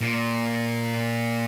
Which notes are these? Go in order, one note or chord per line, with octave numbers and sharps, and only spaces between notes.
A#2